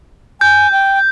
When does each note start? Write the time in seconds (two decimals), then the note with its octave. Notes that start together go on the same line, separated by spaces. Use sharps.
0.41 G#5 G6
0.72 G5